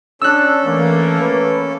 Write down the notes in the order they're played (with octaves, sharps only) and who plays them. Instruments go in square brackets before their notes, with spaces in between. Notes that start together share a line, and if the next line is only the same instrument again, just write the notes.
[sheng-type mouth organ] C#4 A4 [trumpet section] D4 [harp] E6 F#6
[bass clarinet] E3 [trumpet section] A3 A#3
[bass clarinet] B4